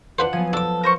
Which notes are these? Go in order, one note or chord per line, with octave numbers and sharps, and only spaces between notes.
D4 F4 B4 C5 F#5
F3 F#3 B3 G#5
D4 A4 D6
A#4 C5 C#6